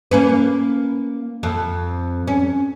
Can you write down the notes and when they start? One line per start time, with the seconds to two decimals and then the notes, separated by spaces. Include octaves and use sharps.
0.11 A#3 C#4 B4
1.43 F2
2.28 C#4